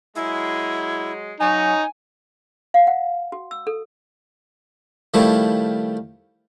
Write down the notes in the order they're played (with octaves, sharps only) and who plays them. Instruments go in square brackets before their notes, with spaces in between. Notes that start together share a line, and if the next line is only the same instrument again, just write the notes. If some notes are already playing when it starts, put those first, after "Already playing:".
[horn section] F#3 G#3 [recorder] E4
[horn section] C#3 C#5 [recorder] F#3 [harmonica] D#4 [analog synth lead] G#5
[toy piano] F5
F#5
F#4
E6
A4
[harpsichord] D#3 F3 G3 A3 E4